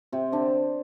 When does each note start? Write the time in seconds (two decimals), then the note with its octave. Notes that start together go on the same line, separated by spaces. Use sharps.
0.12 C3 C4
0.32 D3 D4